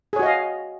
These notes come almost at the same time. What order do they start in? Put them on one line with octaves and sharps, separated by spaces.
G#4 C#5 F#4 D#5 F5